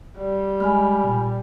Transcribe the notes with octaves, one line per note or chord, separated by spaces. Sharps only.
G3
G#3 G#5 B5 F6
A#2